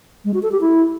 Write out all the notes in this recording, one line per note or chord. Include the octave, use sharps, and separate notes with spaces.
G#3
F#4
A4
G4
E4